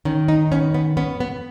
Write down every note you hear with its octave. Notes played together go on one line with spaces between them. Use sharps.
D#3 C#4
D#4
B3 C#4
B3
B3 C#4
B3